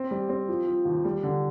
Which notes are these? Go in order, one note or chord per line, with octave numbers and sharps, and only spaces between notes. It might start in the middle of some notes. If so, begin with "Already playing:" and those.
Already playing: C4
G3
C4
F3
F3
D#2
G3
D3